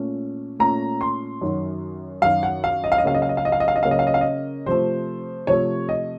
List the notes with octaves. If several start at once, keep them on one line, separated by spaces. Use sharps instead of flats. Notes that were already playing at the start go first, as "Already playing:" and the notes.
Already playing: A#2 A3 C#4
A#2 A3 C#4 A#5
C6
F#2 D#3 F#3
F#2 D#3 F#3 F5
F#5
F5
D#5
F5
D#5
C#3 F#3 A#3 C#4 F5
D#5
F5
D#5
F5
D#5
F5
D#5
F5
D#5
C#3 F#3 A#3 C#4 F5
D#5
F5
D#5
F5
D#5
C3 F3 A3 C5
C3 F3 A3 C#5
D#5